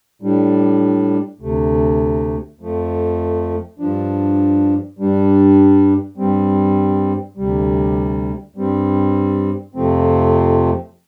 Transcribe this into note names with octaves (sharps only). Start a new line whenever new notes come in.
A2 G3 D4
D2 C3 A3
F2 F3 A3
G2 F3 D4
G2 G3 D4
G2 G3 C4
D2 C3 G3
G2 G3 C4
F2 C3 F3 A3 C4